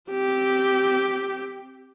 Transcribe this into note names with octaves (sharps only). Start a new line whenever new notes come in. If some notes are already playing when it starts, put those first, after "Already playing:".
C4 G4